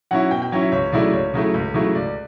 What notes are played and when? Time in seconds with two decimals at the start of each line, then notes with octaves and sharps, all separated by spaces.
0.11 F#3 C#4 E4 F#5
0.31 B2 G5
0.42 G5
0.52 F#3 C#4 E4
0.62 E5
0.72 C#2 C#5
0.93 C#3 F#3 A3 E4 D5
1.13 C#2 C#5
1.34 C#3 F#3 A3 E4
1.54 C#2
1.74 C#3 F#3 A3 E4
1.95 C#2 D5